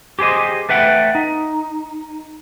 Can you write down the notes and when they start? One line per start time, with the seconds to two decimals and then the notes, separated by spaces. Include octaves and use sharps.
0.19 G4 G#4 C5 D#5
0.69 A3 B4 E5 F#5 G5
1.15 D#4